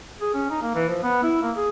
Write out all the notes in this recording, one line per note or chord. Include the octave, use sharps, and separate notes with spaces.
G#4
C#4
D#4
A#3
E3
F3
B3
E4
A#3
G#4